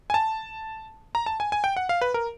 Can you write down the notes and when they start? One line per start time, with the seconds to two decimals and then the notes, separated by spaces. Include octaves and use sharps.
0.10 G#5
0.14 A5
1.15 A#5
1.26 A5
1.40 G#5
1.52 G#5
1.64 G5
1.77 F#5
1.89 F5
2.01 B4
2.14 A#4